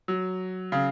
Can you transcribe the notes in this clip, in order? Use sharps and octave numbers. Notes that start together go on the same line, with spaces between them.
F#3
C#3